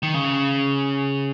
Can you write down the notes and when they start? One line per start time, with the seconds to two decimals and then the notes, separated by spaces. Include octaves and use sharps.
0.03 D#3
0.14 C#3